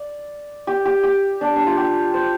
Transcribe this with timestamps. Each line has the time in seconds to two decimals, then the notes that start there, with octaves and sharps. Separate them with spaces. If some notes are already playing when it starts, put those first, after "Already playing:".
Already playing: D5
0.67 G4
0.85 G4
1.03 G4
1.41 D4
1.56 D4
1.67 F4
1.77 G4
2.14 C5